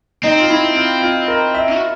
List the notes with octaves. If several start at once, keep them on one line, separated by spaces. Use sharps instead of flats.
C4 D#4
F4
E4
F4
F4
A#4
E5
F#4